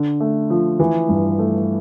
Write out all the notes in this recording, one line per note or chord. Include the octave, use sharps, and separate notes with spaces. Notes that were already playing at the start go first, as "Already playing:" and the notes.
Already playing: D3
A3
F3
E3
G2
A3